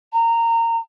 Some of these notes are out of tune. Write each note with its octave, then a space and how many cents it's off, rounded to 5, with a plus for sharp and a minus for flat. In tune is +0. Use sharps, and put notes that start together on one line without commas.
A#5 -20